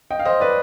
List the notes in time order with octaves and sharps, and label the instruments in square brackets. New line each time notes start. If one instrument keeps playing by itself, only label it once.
[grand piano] D#5 G5
F5
C5 D#5
B4 D5